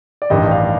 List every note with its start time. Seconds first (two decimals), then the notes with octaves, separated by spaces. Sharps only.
0.22 D5
0.30 A1 G2 D#3 G3 D#5
0.51 F5